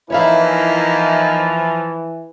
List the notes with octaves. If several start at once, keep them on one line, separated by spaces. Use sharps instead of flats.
E3 F3 A#3 D#4 E4 C#5 E5 F5